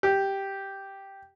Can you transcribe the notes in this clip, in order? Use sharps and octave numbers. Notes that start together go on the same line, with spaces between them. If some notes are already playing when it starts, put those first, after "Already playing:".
G4